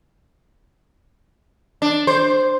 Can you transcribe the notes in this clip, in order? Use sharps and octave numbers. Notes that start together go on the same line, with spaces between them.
D4
C5